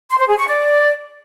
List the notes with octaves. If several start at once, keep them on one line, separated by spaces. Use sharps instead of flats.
C6
C5
G#4
C#6
D5